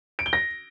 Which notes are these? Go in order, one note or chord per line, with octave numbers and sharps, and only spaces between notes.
D7
G7
A#6